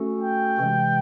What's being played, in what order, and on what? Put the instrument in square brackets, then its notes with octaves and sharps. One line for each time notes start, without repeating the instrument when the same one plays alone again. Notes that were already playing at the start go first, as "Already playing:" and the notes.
Already playing: [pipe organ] A3 C#4 F#4 A4
[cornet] G5
[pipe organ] C3 E3 G#3